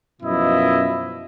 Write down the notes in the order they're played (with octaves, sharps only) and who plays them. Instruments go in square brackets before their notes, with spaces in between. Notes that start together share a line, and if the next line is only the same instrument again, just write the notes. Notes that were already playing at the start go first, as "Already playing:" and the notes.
[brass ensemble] F#2 B2 F3 E4 D#5